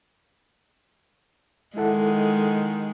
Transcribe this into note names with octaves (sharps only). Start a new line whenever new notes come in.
D#3 G#3 E4 A4 F#5